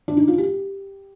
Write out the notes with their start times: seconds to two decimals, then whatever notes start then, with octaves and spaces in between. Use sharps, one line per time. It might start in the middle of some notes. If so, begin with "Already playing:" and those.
0.08 D4
0.17 D#4
0.28 F4
0.38 G4